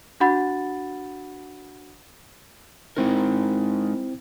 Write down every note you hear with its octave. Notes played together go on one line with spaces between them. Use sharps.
D4 F#4 F#5 B5 A6
G#3 C4 D#4 E4 A#4